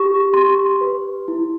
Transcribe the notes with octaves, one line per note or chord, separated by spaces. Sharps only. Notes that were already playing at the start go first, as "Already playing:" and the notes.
Already playing: G4 C#6
G4 C6
B4
E4